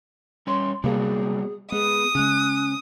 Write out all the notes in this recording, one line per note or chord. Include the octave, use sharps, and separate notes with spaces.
G3 C#4 C#5 C6
C3 F#3 G3 A#3 B3 G#4
G#3 B3 G#4 D#6
C#3 G#3 C#4 F#6